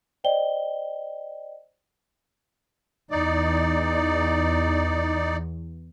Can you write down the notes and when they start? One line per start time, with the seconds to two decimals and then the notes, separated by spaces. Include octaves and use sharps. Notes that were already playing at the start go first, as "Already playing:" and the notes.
0.24 C5 D5 D#5 G5 G7
3.11 E2 D#4 D5